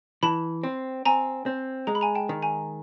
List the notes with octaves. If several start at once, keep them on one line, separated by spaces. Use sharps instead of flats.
E3 A5 B5
C4
C4 G#5 A#5
C4
G#3 A#5
B5
G#5 A#5
G5 A5
D#3
G#5 A#5